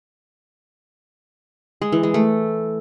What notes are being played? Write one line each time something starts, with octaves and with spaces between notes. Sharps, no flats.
G#3
E3
G#3
A3